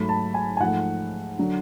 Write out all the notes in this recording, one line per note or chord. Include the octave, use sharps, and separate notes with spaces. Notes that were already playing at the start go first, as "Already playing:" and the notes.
Already playing: G#2 F#3 A3 B5
A5
G#5
G#5
G#2 F3 A3 F#5
D3 F#3